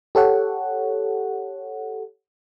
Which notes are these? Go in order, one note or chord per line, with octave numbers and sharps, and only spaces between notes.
G4 A4 C#5 F#5